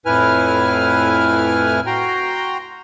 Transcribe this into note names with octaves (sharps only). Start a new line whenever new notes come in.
F2 A2 E4 B4 G#5 F6
F#4 G5 A#5 C6